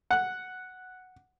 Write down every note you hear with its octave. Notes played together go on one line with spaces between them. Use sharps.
F#5